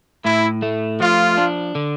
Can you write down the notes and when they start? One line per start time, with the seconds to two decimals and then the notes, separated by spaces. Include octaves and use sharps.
0.24 A2 E4
0.62 A3
1.00 F3 F4
1.37 D4
1.75 D3